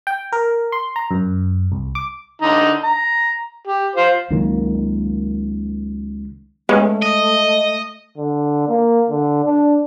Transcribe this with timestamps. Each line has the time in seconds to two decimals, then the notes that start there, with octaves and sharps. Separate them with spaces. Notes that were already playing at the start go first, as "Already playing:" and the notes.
0.07 G5
0.32 A#4
0.72 C6
0.96 A#5
1.11 F#2
1.72 C2
1.95 D6
2.42 D3 D#4 A#5
2.84 A#5
3.67 G4
3.95 F4 C5
4.31 C#2 D#3 F#3 A#3
6.69 G#3 A3 B3 C#4
7.02 D#5
8.18 D3
8.69 A#3
9.09 D3
9.45 D4